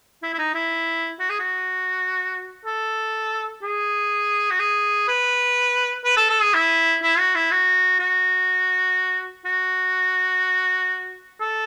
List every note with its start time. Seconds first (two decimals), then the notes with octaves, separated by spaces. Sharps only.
0.23 E4
0.33 E4
0.38 D#4
0.54 E4
1.20 F#4
1.30 G#4
1.40 F#4
2.65 A4
3.62 G#4
4.51 F#4
4.60 G#4
5.08 B4
6.05 B4
6.17 A4
6.30 A4
6.41 G#4
6.54 E4
7.03 E4
7.18 F#4
7.35 E4
7.51 F#4
7.99 F#4
9.45 F#4
11.40 A4